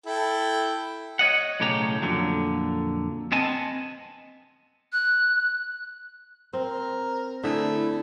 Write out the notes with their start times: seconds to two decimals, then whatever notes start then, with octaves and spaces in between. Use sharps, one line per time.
0.06 E4 A4 G5
1.19 C#5 D#5 F#5
1.60 B1 A2 C#3 G4 C#5 A#5
2.02 F2 A#2 D3 F#3
3.32 B3 C4 D#5 G#5 A5
4.92 F#6
6.53 C4 A#4
7.44 D3 A3 E4 G#4